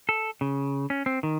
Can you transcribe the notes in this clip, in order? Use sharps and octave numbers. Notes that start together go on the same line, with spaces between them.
A4
C#3
C#4
C4
D#3